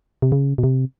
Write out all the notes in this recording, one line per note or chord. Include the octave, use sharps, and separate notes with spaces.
C3
C#3
B2
C3